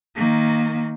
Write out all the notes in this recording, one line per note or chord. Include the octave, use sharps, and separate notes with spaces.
D#3 A#3